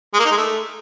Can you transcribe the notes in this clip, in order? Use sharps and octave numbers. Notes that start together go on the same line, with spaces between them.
G#3
A#3
D#4
G#3
A3